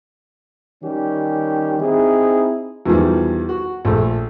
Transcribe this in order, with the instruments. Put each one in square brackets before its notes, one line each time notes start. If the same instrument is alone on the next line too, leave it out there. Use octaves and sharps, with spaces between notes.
[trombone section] D#3 G3 C#4 G4
C4 D#4 E4 G#4
[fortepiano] E2 B2 D#3 F3 G3
F#4
A#1 A3